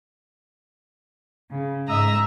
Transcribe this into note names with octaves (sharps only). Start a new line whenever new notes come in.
C#3
G#2 D#5 E5 A#5 E6